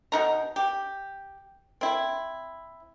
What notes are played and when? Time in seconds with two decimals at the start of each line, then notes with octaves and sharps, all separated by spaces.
0.12 B2 D#4 A#5
0.56 G4
1.81 C4 E4